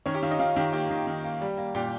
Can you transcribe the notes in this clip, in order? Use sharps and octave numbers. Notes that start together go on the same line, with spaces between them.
D#3 C#4 C#5
G4 G5
D#3 F4 F5
D#4 D#5
D#3 F4 F5
D#3 G4 G5
A#3 G4 G5
D#3
D#3
A#3
G3
A#3
A#2 G4 G5